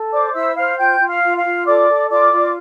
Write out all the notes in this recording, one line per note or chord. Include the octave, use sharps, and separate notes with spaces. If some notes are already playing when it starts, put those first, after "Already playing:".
Already playing: A4
C5 D5 D6
E4 E5 E6
C5 F5 F6
F4 G5 G6
F4
F5 F6
F4
F5 F6
F4
A4 D5 D6
A4
F4 D5 D6
F4